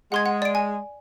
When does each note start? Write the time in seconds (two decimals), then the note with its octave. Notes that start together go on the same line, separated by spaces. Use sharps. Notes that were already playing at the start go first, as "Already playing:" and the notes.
0.12 G#3 F#5 C6 G#6
0.26 F#5
0.42 D5 D7
0.55 G#5